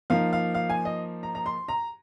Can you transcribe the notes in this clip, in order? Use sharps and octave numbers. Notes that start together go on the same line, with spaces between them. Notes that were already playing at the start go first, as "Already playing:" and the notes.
F3 A#3 D#4 F5
F5
F5
G#5
D#5
A#5
A#5
C6
A#5